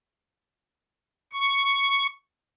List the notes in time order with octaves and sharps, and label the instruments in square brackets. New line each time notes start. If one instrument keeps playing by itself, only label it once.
[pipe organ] C#6